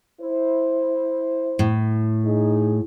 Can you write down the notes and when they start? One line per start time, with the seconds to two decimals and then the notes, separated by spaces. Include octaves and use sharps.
0.21 E4 C5
1.59 A2
2.25 D#4 G#4